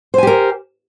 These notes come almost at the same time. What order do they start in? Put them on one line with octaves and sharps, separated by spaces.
C5 G#5 G4 A#4